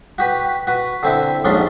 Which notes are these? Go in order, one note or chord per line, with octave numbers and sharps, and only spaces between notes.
F#4 G4 B4
F#4 B4
D3 C4 E4
A#1 D#2 G#2 C#4 D4 C6